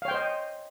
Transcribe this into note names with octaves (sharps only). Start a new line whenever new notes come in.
C5 C#5 D#5 F5 G5